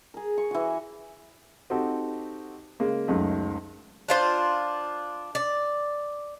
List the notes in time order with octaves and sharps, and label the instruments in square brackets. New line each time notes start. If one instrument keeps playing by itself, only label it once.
[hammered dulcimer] G#4 A#4
C#6
E3 F#4
[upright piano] C4 D#4 F#4 G4 A4
C#3 G#3 A#3
F#1 C#2 F#2 A3 D#4
[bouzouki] D4 F4 C5
D5